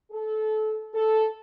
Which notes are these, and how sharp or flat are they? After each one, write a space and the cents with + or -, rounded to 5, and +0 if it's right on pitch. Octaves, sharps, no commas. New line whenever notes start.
A4 -25
A4 -5